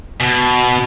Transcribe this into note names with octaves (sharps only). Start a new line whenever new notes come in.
B2